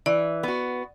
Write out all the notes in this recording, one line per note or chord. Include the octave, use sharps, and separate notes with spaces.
E3 D5
B3 F#4